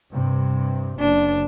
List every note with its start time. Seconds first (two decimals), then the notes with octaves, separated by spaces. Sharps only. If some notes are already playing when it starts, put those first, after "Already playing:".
0.11 G2 C3
1.00 F#1 D4